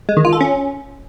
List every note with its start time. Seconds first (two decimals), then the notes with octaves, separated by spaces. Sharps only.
0.09 G#3
0.17 D#3
0.25 F4
0.33 A4
0.41 C#4